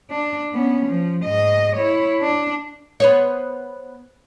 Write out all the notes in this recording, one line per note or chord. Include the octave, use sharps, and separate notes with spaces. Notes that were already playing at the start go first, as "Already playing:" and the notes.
D4
B3 C#4
F3
G#2 D#5
E4 C#5
D4
B3 C5 C#5